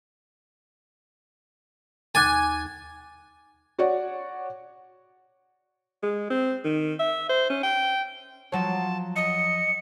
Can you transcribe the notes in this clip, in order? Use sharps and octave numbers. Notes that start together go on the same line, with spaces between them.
D#2 G#5 D6 A6
F#4 C#5 D5 F#5
G#3
C4
D#3
E5
C5
C#4
G5
F3 F#3 C#5 A5
D#5 C#7